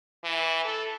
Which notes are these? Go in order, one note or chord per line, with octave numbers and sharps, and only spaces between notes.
E3
A4